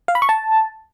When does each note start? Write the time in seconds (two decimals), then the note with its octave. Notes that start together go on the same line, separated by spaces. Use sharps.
0.08 F5
0.15 B5
0.22 C#6
0.29 A5